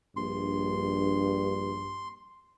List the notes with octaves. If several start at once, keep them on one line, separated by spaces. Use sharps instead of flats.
A#1 G2 C6